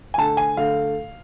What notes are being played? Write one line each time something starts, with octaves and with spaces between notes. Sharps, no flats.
G#5
D3 A3 A5
G#5
D3 A3 F5